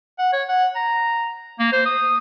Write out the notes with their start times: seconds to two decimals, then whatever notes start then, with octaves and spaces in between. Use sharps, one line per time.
0.19 F#5
0.33 C#5
0.48 F#5
0.75 A#5
1.60 A#3
1.72 C5
1.86 D#6